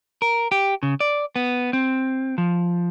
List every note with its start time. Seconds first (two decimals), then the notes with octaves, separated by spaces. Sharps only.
0.22 A#4
0.52 G4
0.83 C#3
1.00 D5
1.36 B3
1.73 C4
2.38 F3